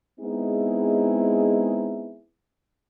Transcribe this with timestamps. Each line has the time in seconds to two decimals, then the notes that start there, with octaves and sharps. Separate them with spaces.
0.20 G#3 B3 C4 D#4 E4 G#4